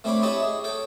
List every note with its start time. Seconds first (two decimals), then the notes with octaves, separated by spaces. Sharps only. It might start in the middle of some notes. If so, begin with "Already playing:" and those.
0.04 A3 C4 D4 C#5 B5 D6
0.22 E4 G4 C#5 D#5 A5 B5
0.43 G#4
0.64 A4 C#5 G5